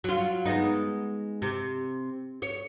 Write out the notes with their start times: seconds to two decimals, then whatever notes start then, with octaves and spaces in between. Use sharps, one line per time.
0.04 F#3 F4
0.45 G#3 B3 D#4
1.42 C3
2.42 C#5